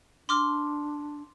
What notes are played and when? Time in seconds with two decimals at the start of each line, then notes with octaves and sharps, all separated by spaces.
0.29 D4 C6 D6 F6